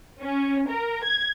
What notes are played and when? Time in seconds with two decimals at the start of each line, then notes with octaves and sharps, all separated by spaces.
0.21 C#4
0.68 A#4
1.03 G#6